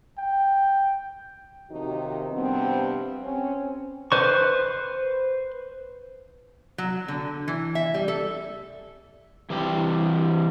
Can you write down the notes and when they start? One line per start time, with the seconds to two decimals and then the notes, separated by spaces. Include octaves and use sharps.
0.18 G5
1.71 D#2 C3 D#3 F3 D#4 F#4
2.32 G2 C3 F3 B3 C4
3.22 C4 C#4
4.12 B4 C5 C#6
6.78 F#3
7.08 D3
7.48 E3
7.75 E5
7.94 G3
8.08 A4
9.50 E3 G3 C4 G4